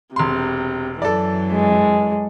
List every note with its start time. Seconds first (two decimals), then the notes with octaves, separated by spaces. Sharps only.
0.16 E1 C3 C6
1.02 F#2 E3 A4 D5
1.52 G#3